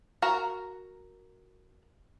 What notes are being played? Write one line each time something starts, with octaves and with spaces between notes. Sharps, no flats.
F#4 A#4 A#5